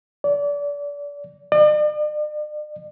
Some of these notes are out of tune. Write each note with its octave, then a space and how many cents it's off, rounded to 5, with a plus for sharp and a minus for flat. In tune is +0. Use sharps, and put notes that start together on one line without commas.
D5 -30
D5 +45